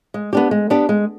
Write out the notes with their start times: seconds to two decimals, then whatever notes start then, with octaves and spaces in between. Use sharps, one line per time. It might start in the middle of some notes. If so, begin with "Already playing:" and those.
0.14 G#3
0.33 B3 D4 G4
0.51 G#3
0.70 B3 D4 G4
0.89 G#3